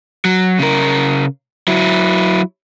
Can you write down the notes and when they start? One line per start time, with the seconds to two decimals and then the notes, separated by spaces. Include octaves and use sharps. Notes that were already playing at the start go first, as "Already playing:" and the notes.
0.25 F#3
0.59 C#3 A#4
1.68 F#3 E4